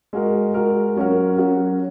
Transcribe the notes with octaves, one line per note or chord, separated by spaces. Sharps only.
G#3 F#4 A#4
G#3 F#4 A#4
F#3 C#4 F#4 A#4
F#3 C#4 F#4 A#4